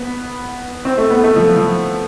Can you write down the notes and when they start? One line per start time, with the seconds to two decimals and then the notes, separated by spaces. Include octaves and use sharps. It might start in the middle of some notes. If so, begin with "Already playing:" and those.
Already playing: B3
0.85 C4
0.98 A3
1.10 B3
1.24 A3
1.36 F3
1.56 F3